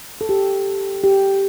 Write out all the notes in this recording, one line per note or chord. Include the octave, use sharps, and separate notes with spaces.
A4
G4
G4